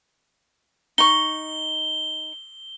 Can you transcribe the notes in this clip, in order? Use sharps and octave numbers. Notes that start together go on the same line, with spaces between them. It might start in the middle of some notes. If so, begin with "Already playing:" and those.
D#4 C#6 G7